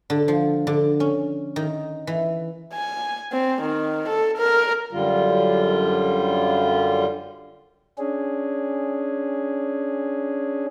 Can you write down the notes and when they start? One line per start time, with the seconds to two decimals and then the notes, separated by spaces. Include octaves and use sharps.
0.10 D3
0.28 F3
0.67 D3
1.00 C#4
1.56 D#3
2.07 E3
2.73 G#5
3.32 C4
3.62 D#3
4.09 A4
4.38 A#4
4.92 F#2 D3 G3 F4
7.98 C#4 D4 G#4